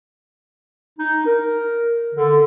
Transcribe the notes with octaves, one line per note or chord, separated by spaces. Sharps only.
D#4
A#4
D3